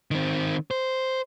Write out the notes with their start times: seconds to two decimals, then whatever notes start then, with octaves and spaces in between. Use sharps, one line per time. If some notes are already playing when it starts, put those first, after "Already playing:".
0.11 D#3 C4
0.71 C5